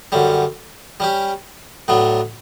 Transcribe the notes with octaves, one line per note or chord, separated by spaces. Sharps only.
F#2 D3 G3 C#4
G3 C#4 G4
A2 F#3 B3 D4